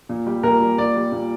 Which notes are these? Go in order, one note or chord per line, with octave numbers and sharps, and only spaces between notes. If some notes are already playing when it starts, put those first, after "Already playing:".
A#2
G3
A#2 A#4
G3
A#2 D5
G3
A#2